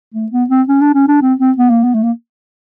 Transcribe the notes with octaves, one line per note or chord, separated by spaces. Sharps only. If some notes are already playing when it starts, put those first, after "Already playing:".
A3
B3
C4
C#4
D4
C#4
D4
C4
C4
B3
A#3
B3
A3
A#3